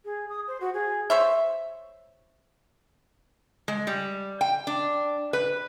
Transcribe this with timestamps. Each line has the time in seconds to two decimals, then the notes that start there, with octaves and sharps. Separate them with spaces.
0.05 G#4
0.29 D#6
0.47 C5
0.60 F#4
0.74 G#4
1.10 C5 C#5 E5
3.68 G#3
3.87 G3
4.41 G5
4.67 D4
5.33 B4